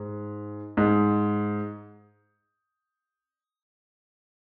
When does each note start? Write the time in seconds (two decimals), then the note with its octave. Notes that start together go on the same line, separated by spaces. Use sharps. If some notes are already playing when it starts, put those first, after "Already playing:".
Already playing: G#2
0.77 G#2